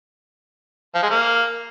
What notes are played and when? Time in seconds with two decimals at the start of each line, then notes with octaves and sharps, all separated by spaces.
0.95 F3
1.03 G#3
1.10 A#3